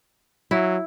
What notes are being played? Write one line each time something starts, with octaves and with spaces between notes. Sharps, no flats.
F#3 E4